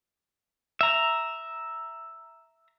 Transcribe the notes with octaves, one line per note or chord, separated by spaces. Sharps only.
E5 A#5